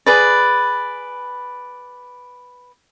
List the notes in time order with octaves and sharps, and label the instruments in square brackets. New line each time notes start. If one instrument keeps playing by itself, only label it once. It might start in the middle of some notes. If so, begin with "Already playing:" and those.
[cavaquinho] G#4 B4 D5